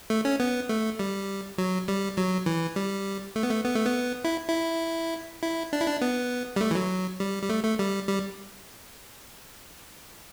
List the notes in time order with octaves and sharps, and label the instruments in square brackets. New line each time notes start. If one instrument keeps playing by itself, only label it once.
[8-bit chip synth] A3
C#4
B3
A3
G3
F#3
G3
F#3
E3
G3
A3
B3
A3
B3
A3
B3
E4
E4
E4
D4
E4
D4
B3
G3
A3
E3
F#3
G3
G3
A3
A3
G3
G3